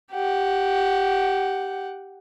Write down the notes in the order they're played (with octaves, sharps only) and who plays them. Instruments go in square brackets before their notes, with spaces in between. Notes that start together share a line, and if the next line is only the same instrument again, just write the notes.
[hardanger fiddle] G4 F#5